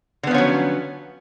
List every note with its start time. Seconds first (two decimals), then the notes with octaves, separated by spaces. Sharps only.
0.23 D3
0.27 B3
0.31 F3
0.34 C#4
0.38 F#3